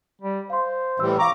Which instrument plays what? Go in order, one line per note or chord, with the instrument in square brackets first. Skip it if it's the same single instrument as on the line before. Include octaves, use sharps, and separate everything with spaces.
[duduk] G3
[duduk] C5 [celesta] F5 C6
[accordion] A2 E3 G3 [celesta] E6
[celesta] F5 C#6 [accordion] A#5 D6